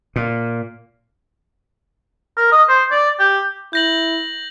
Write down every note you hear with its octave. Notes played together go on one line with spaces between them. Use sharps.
A#2
A#4
D#5
C5
D5
G4
E4 G6 A#6 F#7